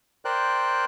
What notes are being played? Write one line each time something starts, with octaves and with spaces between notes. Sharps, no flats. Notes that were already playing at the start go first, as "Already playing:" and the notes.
A#4 C5 D5 G5 F#6